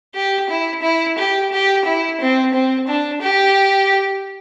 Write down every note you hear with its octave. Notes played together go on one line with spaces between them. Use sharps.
G4
E4
E4
G4
G4
E4
C4
C4
D4
G4